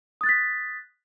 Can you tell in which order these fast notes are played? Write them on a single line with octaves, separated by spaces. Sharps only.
D#6 A6 F#6 B6